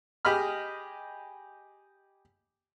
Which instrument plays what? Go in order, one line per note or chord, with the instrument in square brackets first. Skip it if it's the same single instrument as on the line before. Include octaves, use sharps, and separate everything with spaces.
[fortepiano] G4 G#4 D#5 B5 F6